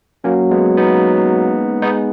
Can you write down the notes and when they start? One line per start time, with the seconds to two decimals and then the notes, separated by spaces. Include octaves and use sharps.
0.24 F#3 A#3 C#4
0.51 G#3 B3
0.77 B3 D#4
1.82 G#3 B3 D#4